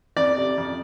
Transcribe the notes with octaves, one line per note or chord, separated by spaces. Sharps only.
F2 D5
C3
F2